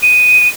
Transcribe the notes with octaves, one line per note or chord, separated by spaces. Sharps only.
D#7